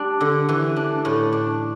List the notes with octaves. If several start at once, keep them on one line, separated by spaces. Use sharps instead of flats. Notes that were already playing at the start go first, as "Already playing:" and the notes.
Already playing: G3 D4
D3
E3
D4
A2
D4